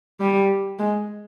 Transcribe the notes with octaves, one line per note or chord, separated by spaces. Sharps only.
G3
G#3